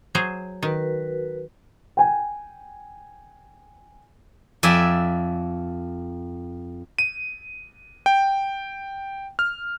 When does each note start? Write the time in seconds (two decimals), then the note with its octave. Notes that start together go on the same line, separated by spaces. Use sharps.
0.15 F#3 G#4 C5
0.63 D#3 F#4 A#4 B4
1.97 G5 G#5
4.63 F2 D5 E5 G#5
6.99 D#7
8.06 G5
9.39 F6